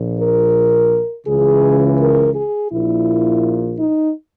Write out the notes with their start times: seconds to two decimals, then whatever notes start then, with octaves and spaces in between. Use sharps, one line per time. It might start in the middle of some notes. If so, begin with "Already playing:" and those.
Already playing: A#1 A#2
0.18 A#4
1.26 C#2 C#3 E3 G#4
1.98 A#4
2.34 G#4
2.70 A#1 A#2 E4
3.78 D#4